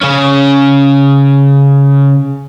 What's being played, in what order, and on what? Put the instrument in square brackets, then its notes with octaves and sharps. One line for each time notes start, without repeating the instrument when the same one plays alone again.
[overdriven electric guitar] C#3 C#4